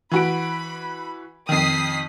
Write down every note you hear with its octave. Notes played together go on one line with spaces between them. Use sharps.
E3 F#4 B5 D7
F2 D#3 D#6 B6 C7